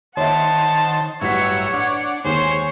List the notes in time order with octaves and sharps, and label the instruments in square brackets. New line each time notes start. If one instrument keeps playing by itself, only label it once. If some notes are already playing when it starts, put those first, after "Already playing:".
[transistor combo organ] D#3 C5 [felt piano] C#5 E5 [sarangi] F#5 [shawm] A5
[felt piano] A1 B6 [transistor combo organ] G2 F#3 E5 [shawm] C#5 [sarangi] F#5
[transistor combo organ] D4 [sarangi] F#5
[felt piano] D#2 [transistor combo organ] G#3 [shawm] C5 [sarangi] C#5